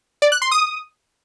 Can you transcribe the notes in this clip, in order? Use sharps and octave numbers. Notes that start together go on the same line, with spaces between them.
D5
F#6
C6
D#6